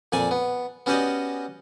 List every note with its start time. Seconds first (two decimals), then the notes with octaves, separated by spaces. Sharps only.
0.12 F2 A#2 D5 G#5
0.31 B3
0.86 B3 C#4 F#4 G4 D5 D#5